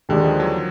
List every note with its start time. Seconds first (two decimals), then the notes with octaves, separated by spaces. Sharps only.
0.09 D#2 D3 D#3 G#3 D4
0.25 F3
0.40 F#3